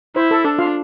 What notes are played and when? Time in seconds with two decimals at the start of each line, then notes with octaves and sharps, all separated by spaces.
0.16 E4 C5
0.31 A4
0.45 D4 A4
0.59 F4 F5